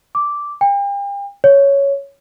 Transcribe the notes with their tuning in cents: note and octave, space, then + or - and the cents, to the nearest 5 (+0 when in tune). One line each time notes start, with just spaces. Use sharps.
D6 -5
G5 +40
C#5 +5